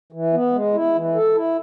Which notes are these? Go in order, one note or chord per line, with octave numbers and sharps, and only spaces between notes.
E3
B3
G#3
E4
E3
A4
E4